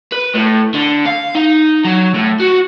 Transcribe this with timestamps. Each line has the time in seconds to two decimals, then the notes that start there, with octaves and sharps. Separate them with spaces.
0.12 B4
0.35 A2
0.74 D3
1.06 F5
1.35 D#4
1.85 F#3
2.14 A2
2.40 F#4